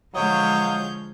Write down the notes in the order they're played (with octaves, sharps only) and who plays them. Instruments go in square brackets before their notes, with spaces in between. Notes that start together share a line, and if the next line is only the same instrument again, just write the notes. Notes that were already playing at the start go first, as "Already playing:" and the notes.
[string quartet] D3 C#5 G6 [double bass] F3 G#3 [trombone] F#3 [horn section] D#5 F5